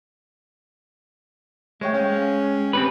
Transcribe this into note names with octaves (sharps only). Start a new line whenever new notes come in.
G#3 A3 C5 C#5 G5
C#4 F5
C4 C#4 G4 B4